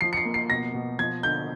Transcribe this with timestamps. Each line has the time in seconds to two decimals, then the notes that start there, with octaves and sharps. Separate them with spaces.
0.01 F3 C7
0.13 C#7
0.17 C7
0.25 A#3
0.34 C7
0.50 B2 A#6
0.74 B2
0.99 F3 G#6
1.23 D3 G6